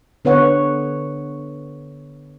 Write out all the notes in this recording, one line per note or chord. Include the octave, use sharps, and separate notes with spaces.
D3 B3 B4 C#5 F#5